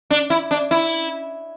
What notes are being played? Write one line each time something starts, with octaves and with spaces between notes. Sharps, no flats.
D4
E4
D4
E4